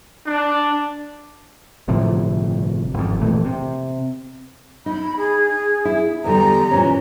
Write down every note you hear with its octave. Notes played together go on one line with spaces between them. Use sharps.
D4
G1 A2 C3 F3
G#1 F2
A#1 A#2 E3 A3
C3
D#4 B5
G#4
E4
E2 D3 G3 A#5
A#2 E3 C#4